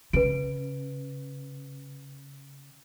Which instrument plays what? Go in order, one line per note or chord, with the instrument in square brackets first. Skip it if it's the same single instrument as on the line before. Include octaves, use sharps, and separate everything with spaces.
[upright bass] C#3 [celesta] B4 D7